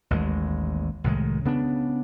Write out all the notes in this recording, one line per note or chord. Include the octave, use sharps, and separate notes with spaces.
A1 D#2 G#3
C2 A2 D#3 G#3
C#3 B3 D4